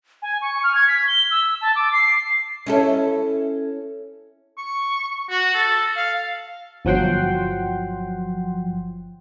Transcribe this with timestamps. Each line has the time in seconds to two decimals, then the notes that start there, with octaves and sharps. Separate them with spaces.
0.22 G#5
0.42 C#6
0.64 F6
0.75 G#6
0.88 B6
1.08 G7
1.31 E6
1.61 A5
1.76 D6
1.93 C7
2.66 C#4 E4 A4
4.58 C#6
5.30 F#4
5.54 A4
5.96 F5
6.85 G1 F3 F#3 F#5 G5 C6